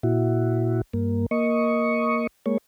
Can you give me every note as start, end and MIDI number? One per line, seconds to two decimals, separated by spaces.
0.03 0.81 46
0.03 0.81 64
0.03 0.81 66
0.93 1.26 43
0.93 1.26 58
1.31 2.27 58
1.31 2.27 75
1.31 2.27 85
2.46 2.58 56
2.46 2.58 58
2.46 2.58 73